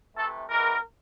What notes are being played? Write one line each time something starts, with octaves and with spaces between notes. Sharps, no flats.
C3 E3 A3 A4
E3 G#3 B3 A#4